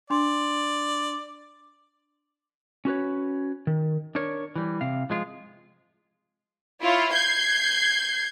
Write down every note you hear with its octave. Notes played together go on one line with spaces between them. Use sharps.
D4 D5 C6
C#4 F#4 B4 C#5
D#3
D4 A#4 C#5
E3 G3
C3 F5
F3 G#3 F4
E4 F4 C#5
G6 G#6 C7